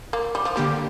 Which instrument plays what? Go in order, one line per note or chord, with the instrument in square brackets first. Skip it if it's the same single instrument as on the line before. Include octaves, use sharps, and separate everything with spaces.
[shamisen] A#3
G3
F3
[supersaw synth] D3 A#3 G4 [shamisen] G3